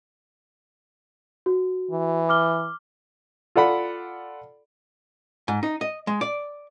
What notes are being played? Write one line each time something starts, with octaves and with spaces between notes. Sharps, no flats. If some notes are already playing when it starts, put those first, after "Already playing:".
F#4
E3
D6 F6 G7
F4 A4 D5 F#5 B5
G#2
D#4
D#5
G#3
D5